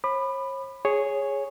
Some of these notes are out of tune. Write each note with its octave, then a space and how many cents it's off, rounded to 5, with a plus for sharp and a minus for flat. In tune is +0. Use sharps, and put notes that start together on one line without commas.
C#5 -40 B5 +5 D6 +45
G#4 +0 C#5 +0